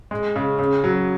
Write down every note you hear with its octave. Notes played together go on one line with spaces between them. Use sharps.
G#3
C#3
C#3
F#3